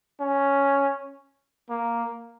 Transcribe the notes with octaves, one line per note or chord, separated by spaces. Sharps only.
C#4
A#3